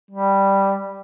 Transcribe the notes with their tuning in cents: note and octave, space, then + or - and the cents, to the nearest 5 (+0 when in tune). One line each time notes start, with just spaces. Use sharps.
G3 +0